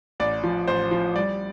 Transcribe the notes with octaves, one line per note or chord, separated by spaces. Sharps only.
A1 D5
F3
A1 C5
F3
G3 D5